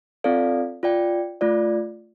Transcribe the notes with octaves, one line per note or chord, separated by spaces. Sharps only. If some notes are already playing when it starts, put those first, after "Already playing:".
C4 F4 A4 D5 F5
F4 D5 G5
A3 F4 D5